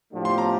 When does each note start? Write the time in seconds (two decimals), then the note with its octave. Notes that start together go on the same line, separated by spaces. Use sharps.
0.13 A2 F3 A3 D4 G4
0.25 C6
0.38 A#5